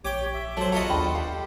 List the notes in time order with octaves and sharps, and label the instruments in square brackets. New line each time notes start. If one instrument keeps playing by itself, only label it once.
[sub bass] A#1 [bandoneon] G4 C#5 [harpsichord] G5 D6
[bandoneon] E5
[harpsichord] F#3 C5 [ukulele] A4
[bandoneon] E2 F4 [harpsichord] F#4 A4 D#5 [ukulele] A#5
[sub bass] D#2 [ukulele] D4 G5 B5
[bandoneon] G4 [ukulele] F5 G5